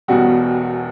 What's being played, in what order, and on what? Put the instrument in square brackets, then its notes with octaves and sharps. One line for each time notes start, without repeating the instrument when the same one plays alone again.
[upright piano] E1 E2 B2 G3 F#4